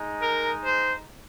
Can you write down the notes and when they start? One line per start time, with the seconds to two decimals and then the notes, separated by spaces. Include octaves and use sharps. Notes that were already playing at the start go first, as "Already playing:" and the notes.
Already playing: G#3 D#4
0.21 A#4
0.65 C5